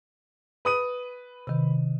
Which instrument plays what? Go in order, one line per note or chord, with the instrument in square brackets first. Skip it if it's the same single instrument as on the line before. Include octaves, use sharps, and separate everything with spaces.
[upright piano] B4 D#6 D#7
[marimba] C3 D#3